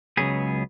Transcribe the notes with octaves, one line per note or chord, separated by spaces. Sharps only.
C#2 C#3 F#3 B3 G#4